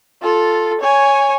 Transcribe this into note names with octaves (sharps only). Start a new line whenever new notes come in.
F4 A4
C#5 G#5